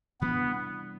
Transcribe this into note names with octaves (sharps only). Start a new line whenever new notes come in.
C3 E3 G3 B3 D4